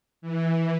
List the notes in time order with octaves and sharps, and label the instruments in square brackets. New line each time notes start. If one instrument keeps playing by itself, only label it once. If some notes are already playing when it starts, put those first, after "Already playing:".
[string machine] E3